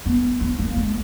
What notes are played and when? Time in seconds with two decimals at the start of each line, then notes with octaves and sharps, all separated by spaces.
0.06 B3
0.41 B3
0.59 A#3
0.76 G#3